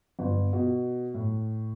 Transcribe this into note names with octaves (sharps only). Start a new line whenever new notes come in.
G1
B2
A2